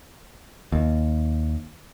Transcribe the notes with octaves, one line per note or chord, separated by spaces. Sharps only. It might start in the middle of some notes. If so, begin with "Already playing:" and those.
D#2